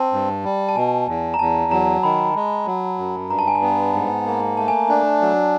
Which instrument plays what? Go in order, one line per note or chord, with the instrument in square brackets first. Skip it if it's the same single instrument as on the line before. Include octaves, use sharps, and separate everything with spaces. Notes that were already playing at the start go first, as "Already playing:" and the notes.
Already playing: [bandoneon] C4 [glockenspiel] A5
[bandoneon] G2
G3
[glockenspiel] A5
[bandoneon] B2 [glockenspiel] G#5
[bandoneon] E2
[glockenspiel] A#5
[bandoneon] E2 [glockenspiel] A5
[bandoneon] F#3 [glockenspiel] A#5
[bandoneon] D#3 [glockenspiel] B5
[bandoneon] G#3
F#3
F#2
[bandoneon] G2 [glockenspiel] A#5
[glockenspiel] A5
G#5
A5
[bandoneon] B3
G#2
A#3
[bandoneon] A3 [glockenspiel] A5
[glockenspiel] G#5
[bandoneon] D4 [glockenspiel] G#5
[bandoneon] F#3